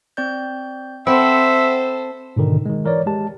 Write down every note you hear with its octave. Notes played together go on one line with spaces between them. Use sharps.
C4 D5 G6
C4 A4 C5 E5 F#5 G5 B5
G#2 B2 D3 D#3
D#3 G#3
E3 A#4 C#5 D5
G#3 G4 A5